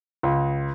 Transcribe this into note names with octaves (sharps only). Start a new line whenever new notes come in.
C#2